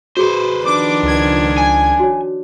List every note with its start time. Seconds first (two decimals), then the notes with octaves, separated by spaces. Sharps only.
0.17 F#4 G#4 B4 C5
0.65 D#3 F3 D4 D6
1.03 C#2 G#6
1.58 G#5
2.00 F#4 C#5